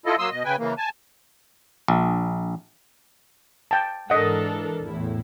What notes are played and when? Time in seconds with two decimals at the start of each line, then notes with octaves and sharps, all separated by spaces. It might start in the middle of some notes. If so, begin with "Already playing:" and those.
0.06 E4 F4 A4 D#5
0.19 F#3 A#3 C6 D#6 E6
0.31 B2 D#5
0.45 C#3 B4 G5 G#5
0.58 C#3 E3 A#3
0.78 G#5 A5
1.88 A#1
3.71 G5 A5
4.10 G#2 E3 D4 A4 A#4 D#5 F#5
4.84 E2 A2 E4